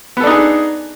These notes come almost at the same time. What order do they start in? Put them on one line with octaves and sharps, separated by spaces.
B3 A4 D4 D#4 G#4